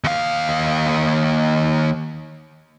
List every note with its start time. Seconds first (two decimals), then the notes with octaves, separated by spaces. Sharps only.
0.04 D#2 F5